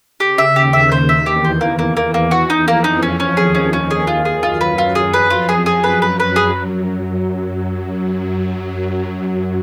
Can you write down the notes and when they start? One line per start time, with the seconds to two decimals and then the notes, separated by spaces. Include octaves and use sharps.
0.20 C#3 G4
0.38 E5
0.56 D#2 D#3 G4
0.73 E5
0.92 C5
1.09 E5
1.26 E2 E3 G4
1.44 C5
1.61 A#3
1.79 A#3
1.97 A#3
2.14 A#3
2.31 F#4
2.50 D#4
2.67 F2 F3 A#3
2.84 D#4
3.03 F2 F3 C#4
3.20 C#4
3.37 D#2 D#3 G#4
3.55 C#4
3.73 C#4
3.91 G#4
4.07 F4
4.25 G#4
4.42 F#2 F#3 F4
4.61 B4
4.78 F4
4.95 G#4
5.13 F2 F3 B4
5.30 F4
5.49 G#4
5.66 G#4
5.84 F#2 F#3 B4
6.02 B4
6.20 B4
6.36 G#4